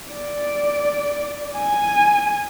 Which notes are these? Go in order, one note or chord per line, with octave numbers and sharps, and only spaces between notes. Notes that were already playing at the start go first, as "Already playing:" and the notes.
D5
G#5